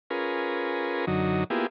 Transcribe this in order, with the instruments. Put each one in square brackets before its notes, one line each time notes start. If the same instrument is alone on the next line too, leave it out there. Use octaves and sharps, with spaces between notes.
[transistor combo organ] C#4 F4 G#4 A#4 B4
F#2 D3 F#3 D#4
A#3 B3 E4 F4 G4 G#4